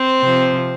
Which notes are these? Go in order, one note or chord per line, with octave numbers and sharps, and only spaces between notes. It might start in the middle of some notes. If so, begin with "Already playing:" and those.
Already playing: C4 C5
C3 F3